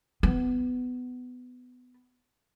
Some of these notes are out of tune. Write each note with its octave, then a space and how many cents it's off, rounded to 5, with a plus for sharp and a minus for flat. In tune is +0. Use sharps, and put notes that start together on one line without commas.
B3 +15